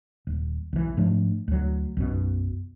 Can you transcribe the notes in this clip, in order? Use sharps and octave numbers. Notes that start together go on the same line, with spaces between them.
D#1
B1 E3
G#2 F3 A3 D4
D2 F#3
B1 F#2 B2